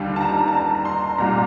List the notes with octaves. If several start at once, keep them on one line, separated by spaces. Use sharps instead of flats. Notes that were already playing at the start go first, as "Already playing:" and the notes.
Already playing: D#2 D3 G3 A5
A5
A#5
A5
A#5
A#5
C6
C2 A#2 G3 A#5